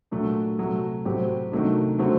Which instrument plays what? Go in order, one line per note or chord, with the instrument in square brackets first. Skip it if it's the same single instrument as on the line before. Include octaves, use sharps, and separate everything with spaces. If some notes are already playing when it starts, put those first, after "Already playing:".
[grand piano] A#2 F#3 A3 D4 F#4
C3 F#3 A3
A2 F#3 C4 G4
C3 D#3 F#3 A3 D4
D3 F#3 A3 C4 F#4